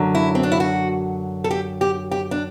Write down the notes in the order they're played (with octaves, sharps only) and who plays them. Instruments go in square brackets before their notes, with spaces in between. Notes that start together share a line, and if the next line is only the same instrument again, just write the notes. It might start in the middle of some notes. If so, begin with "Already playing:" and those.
Already playing: [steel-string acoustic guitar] F#2 D3 F#3
E4
C4
D4
E4
F#4
A4
G4
G4
G4
D4